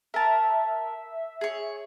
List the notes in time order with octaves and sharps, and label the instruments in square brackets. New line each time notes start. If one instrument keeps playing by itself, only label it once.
[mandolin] A#4 A5 [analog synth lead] E5
[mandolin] G#4 C#5